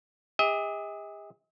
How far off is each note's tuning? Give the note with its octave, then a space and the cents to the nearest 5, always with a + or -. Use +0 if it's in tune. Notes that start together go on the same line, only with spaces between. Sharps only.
G#4 -45 D#5 +45